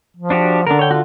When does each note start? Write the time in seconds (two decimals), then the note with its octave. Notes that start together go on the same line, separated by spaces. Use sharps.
0.17 F3
0.30 D4 F#4 G4
0.67 D3 D4 A#4
0.79 C#5 G5
0.91 F4 F#4